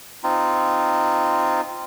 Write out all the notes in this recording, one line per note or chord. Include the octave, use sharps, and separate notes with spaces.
C4 D#4 F4